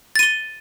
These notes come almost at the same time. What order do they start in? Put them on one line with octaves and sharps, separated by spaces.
A6 D#7 G7